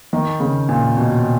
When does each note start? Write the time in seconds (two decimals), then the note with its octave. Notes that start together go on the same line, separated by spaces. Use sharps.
0.13 D#3
0.40 C#3
0.69 A#2
0.97 B2